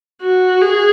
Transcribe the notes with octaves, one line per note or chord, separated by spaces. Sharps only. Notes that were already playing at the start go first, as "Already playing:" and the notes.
F#4
G#4